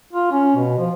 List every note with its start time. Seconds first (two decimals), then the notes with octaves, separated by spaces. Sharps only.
0.13 F4
0.32 C#4
0.56 B2
0.78 F3